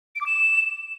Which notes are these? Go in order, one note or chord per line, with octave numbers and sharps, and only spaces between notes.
D7
D6
E7